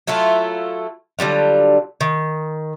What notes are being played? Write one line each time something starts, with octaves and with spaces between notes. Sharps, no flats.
F#3 A3 E4 F4
D3 F#3 G3 F4
D#3